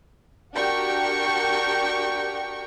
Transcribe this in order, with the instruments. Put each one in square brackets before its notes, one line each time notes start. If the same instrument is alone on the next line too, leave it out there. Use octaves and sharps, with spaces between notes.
[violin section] D4 F#4 G4 A#4 G5 C#6